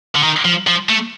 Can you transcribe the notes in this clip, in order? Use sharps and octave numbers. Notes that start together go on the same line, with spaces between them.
D3
D#3
F3
F3
A3